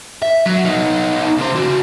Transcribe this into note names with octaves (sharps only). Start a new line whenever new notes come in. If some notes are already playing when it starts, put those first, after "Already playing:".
E5
F#3
B3 D#4
C#3 C5
C#3 F#4